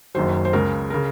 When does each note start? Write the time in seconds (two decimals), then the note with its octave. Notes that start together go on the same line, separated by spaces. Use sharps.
0.15 F#1 F#2 D#3 F#3 C5
0.45 C5
0.53 C#2 C#3 G#3 A#4
0.90 C#3 A#4